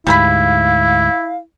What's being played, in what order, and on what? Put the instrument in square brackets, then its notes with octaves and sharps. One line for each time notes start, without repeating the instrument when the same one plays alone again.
[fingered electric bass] D2 G#2 [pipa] G3 A#4 B5 [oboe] E4 [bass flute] F5